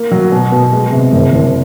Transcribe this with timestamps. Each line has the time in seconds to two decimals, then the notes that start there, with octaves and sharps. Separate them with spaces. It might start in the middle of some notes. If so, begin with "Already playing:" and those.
Already playing: A#3
0.12 F#3
0.32 B2
0.52 B2
0.73 G#3
0.92 C3
1.13 F#1
1.33 F#1